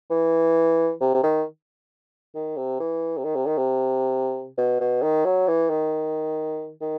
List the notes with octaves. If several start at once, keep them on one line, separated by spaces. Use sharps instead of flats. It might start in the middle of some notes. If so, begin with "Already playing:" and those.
E3
C3
C3
D#3
D#3
C3
E3
C3
D#3
C3
D#3
C3
B2
B2
D#3
F#3
E3
D#3
D#3